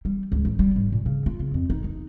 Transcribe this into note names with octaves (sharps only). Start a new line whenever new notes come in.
G3
C#2
A1
G3
G#2
A#2
C#3
F4
C#3
F2
D#4
D#4